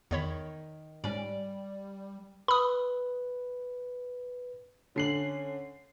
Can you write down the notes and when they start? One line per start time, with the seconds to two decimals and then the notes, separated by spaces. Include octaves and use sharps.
0.11 E2 D#3 C#5 B5
1.04 G#2 G3 C#4 D5
2.48 B4 B5 D#6
4.96 D3 C#4 C7 F#7